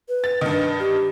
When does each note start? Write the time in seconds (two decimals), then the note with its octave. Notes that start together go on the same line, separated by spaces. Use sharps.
0.09 B4
0.24 A6
0.41 G2 D#3
0.80 G4